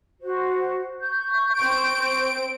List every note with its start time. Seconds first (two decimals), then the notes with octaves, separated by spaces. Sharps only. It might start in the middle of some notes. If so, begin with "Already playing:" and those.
0.21 F#4 C5
1.00 C#6 G6
1.58 C4 D7